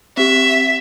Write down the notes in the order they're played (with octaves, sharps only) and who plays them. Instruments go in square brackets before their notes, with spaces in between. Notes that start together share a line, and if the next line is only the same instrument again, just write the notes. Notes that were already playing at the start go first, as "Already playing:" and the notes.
[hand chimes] C4 G4 [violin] E5